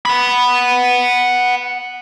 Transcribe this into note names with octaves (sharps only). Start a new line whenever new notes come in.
F#5 B5